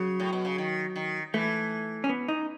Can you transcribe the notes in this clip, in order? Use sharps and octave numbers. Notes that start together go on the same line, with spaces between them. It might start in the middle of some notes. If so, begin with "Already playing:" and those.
Already playing: C#3 F#3
A2
B2
C#3
D#3
D#3
E3 A3
C#4
B3
D#4